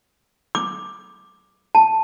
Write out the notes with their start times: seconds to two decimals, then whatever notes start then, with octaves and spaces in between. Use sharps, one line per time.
0.55 D6
1.75 A5